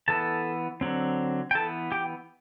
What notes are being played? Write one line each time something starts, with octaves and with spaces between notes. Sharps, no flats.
E3 B3 A4 A5
D3 F#3 C4
G5
E3 B3 A4 A5
G4 G5